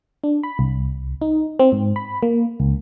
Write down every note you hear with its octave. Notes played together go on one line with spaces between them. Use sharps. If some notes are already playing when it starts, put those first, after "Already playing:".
D4
B5
C2
D#4
C4
G#2
B5
A#3
C#2